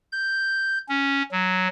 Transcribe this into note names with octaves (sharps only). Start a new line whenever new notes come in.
G6
C#4
F#3